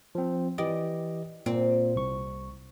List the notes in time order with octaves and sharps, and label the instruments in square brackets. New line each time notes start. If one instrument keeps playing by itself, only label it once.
[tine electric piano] F3 C4
[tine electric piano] E3 G4 D#5 [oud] D5
[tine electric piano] A#2 [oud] C4
[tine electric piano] C2 C#6